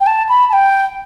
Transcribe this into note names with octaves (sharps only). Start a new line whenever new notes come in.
G5
A5
B5
A5
G5